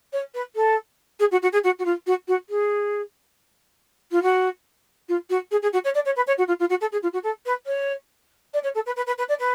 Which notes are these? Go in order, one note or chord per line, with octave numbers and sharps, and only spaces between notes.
C#5
B4
A4
G#4
F#4
F#4
G#4
F#4
F#4
F4
F#4
F#4
G#4
F4
F#4
F4
F#4
G#4
G#4
F#4
C#5
D5
C#5
B4
C#5
F#4
F4
F4
F#4
A4
G#4
F4
F#4
A4
B4
C#5
D5
C#5
A4
B4
B4
B4
B4
D5
B4